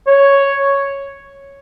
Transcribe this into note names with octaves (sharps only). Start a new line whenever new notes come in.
C#5